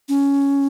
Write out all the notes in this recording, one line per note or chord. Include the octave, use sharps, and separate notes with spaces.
C#4